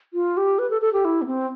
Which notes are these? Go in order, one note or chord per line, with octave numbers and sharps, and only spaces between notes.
F4
G4
B4
A4
A4
G4
E4
B3
C4